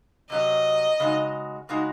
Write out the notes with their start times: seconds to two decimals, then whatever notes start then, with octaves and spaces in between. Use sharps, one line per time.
0.30 C3 F#3 C#4 D#5
1.00 C#3 G#3 D#4 F#4
1.69 C#3 G#3 D#4 F#4